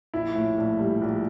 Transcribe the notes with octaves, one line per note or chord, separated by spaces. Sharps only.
A#1 E4
A2
A#1
G3
A#1